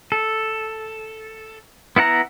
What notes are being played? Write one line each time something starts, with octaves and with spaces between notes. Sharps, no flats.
A4
B3 E4 F#5 A#5